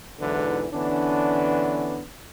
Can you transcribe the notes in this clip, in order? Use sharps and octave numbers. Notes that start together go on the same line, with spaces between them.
B1 E2 G#2 D3 E3 B4
D3 E3 B3 C#4 D4